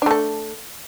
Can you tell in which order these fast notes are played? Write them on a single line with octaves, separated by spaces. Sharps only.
D4 A3 A4